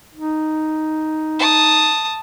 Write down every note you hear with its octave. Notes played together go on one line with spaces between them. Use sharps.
D#4
A5 D#6